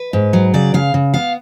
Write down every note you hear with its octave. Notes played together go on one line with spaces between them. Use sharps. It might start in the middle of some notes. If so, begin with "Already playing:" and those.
Already playing: B4
G#2
F#3
C#3 D5
C#3 F5
C#3
B3 F5